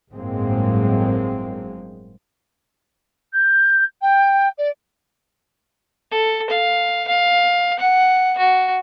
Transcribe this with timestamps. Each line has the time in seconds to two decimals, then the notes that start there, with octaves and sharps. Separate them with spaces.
0.11 G1 A2 F#3 G#3 A#3 C4
3.33 G6
4.01 G5
4.58 D5
6.11 A4
6.50 F5
7.08 F5
7.79 F#5
8.38 F#4